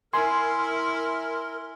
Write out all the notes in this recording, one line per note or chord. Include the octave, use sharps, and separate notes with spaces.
E4 A#4 G#5 C6